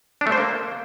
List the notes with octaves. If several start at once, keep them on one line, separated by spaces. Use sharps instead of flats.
D4
A3
C5
A#3